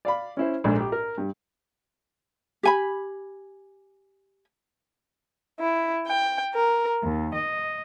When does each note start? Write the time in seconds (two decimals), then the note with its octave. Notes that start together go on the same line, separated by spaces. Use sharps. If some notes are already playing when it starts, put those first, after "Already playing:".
0.05 D5 F5 B5
0.37 C#4 E4 C5
0.64 A#1 G#2 D4 A4
0.80 G4
0.92 A#4
1.18 G2
2.63 G4 G#5 B5
5.60 E4
6.07 G5
6.54 A#4
7.03 D#2
7.33 D#5